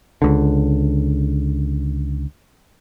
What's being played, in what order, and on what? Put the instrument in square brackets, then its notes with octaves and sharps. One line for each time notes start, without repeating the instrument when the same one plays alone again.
[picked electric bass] C#2 D3